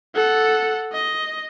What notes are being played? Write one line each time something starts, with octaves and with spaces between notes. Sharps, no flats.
A4 F#5
D#5